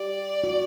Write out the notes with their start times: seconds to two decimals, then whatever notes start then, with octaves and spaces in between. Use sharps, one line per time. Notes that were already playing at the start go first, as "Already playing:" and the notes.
Already playing: G4 D5
0.44 F#4